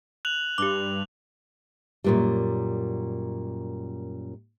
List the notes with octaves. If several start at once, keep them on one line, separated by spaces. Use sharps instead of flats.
F#6 F7 F#7
G2 G4 D6
F#2 A#2 G3